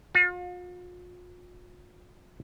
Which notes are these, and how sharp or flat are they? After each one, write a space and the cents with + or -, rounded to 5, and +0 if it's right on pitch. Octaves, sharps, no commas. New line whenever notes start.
F4 +40